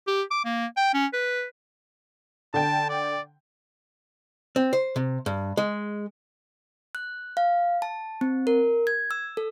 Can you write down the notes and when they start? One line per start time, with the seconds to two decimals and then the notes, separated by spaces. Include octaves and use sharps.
0.07 G4
0.31 D6
0.45 A#3
0.77 G5
0.94 C#4
1.13 B4
2.54 D3 G5 A5
2.89 D5
4.56 C4
4.73 C5
4.96 C3
5.26 G2
5.57 G#3
6.95 F#6
7.37 F5
7.82 A5
8.21 C4
8.47 A#4
8.87 G#6
9.11 E6
9.37 A4